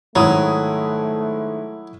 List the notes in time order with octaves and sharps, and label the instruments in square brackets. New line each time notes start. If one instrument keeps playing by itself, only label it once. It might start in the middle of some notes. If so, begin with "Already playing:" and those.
[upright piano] G#2 D#3 [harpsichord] F#3 [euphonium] A3 [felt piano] E4 D#6